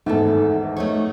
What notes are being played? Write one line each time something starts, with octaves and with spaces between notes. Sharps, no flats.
G#1 E2 G#2 A3 B3 A4
A3 D#4 C#5